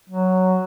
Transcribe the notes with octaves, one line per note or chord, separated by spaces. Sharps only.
F#3